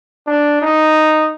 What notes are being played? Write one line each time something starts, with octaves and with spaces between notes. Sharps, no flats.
D4
D#4